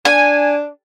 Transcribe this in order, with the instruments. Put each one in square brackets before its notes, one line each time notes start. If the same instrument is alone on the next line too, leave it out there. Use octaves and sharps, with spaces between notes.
[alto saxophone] D4 [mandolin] G#5